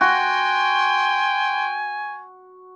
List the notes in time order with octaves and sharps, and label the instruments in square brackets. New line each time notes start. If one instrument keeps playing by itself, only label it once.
[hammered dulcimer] F#4 [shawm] G5 [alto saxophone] G#5 [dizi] C6